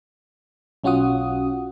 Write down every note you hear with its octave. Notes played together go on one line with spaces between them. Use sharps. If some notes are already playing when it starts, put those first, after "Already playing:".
B1 C#4 F4 F#4 F#5 D#6